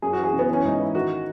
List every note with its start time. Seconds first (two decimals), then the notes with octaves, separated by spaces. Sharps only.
0.02 F#2 G#4
0.13 F#4
0.18 E3
0.24 G#4
0.33 C#3
0.39 B3
0.49 E3 C#4
0.64 G#2 D#4
0.80 E3 E4
0.95 D#3 F#4